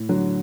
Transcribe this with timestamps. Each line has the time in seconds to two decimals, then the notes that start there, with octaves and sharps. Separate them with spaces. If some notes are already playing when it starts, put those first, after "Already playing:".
Already playing: A2
0.09 D3 F#3